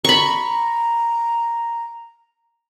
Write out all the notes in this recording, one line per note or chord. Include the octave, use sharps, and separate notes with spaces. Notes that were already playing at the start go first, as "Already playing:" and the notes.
A#5 B5 C#6